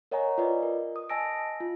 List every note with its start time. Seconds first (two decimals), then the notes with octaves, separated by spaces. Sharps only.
0.11 A#4 C#5 D#5 F#5 G#5 A#5
0.38 F4 B4 D5 D#5
0.63 A#4
0.96 D#6
1.09 D#5 G#5 A5 E6 A#6 D7
1.60 F4